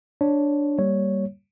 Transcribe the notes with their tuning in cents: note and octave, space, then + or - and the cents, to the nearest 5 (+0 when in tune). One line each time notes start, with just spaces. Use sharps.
D4 -5 C#5 +0
G3 +0 A#3 +0 C#5 +0